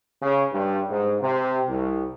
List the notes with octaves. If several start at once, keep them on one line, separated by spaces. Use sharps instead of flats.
C#3
G2
G#2
C3
C2